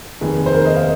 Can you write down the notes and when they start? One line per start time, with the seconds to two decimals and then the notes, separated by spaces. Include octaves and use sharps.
0.21 F1 D#2 D#3 G#4
0.46 C5
0.54 A#4
0.65 D#5
0.76 F5